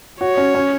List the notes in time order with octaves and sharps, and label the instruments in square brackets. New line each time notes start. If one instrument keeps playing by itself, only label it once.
[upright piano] F#4 [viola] C#5
[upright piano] C#4
C#4